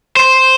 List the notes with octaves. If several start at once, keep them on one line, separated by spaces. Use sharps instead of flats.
C5